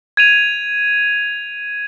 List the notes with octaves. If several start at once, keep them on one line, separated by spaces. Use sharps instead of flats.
G#6 D#7 F7